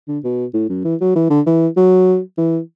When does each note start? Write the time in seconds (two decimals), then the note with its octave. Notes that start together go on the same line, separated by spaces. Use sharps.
0.08 D3
0.24 B2
0.54 A2
0.69 F#2
0.84 E3
1.01 F#3
1.15 E3
1.30 D3
1.46 E3
1.77 F#3
2.38 E3